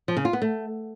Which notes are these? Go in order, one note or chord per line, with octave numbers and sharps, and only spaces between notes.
F3
C#3
F4
B3
A3